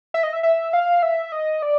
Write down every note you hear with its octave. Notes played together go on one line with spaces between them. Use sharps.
E5
D#5
E5
E5
F5
E5
D#5
D5